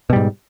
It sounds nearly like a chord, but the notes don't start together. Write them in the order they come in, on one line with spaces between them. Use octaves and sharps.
B2 G3 G#2